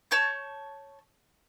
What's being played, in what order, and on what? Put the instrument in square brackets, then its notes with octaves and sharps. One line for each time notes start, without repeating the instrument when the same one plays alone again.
[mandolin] C#5 A5 C#6 G6